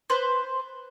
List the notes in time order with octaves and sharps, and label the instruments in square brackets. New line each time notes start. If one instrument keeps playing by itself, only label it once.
[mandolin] B4 C5